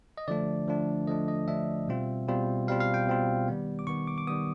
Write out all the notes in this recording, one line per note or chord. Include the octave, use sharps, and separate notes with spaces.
D#5
D3 F3 A3 D4 D5
D3 F3 A3 D4
D3 F3 A3 D4 D#5
D#5
D3 F3 A3 D4 E5
B2 G3 C4 F4
B2 G3 C4 F4
B2 G3 C4 F4 F5
F5
G5
B2 G3 C4 F4
D#3 G3 B3
D6
D#3 G3 B3 C#6
D6
D6
D#3 G3 B3 D#6